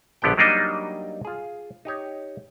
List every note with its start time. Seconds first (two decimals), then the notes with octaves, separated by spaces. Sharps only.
0.22 A#1 D3 B3 G4 G5
0.37 F#3 G3 A#3 D4 D#4 D#5
1.25 F4 G#4
1.85 D#4 G4 C#5